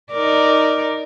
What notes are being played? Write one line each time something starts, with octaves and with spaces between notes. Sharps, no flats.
D#4 A#4 D5